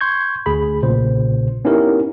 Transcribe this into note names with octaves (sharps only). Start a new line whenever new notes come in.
C6 C#6 G6 G#6
D2 G#4 B5
B1 A#2 C#3 C5
B3 C#4 D#4 E4 G4 A#4